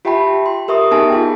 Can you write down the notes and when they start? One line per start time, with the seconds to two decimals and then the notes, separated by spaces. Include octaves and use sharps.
0.05 F4 G4 E5 G5 A5 B5
0.46 C6
0.68 G4 A#4 E5 C#6 D#6
0.91 B3 D#4 G#4 G#5 A5 A#6
1.10 F4 G#4 G5